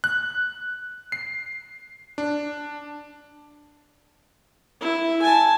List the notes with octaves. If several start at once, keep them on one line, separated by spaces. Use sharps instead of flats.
F#6
C7
D4
E4
G#5 A5